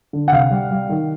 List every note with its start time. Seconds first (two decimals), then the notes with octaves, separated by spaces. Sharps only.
0.13 D3
0.28 F#5
0.32 C3 F5
0.51 G3
0.71 G3
0.89 D#3